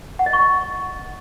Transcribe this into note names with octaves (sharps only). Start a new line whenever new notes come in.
F#5
D#5
C#6